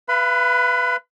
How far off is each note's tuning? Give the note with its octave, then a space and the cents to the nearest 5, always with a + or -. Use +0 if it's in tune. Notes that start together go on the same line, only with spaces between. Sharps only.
B4 +0 F5 -40 B5 +35